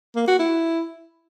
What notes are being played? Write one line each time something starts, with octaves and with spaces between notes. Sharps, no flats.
A#3
F#4
E4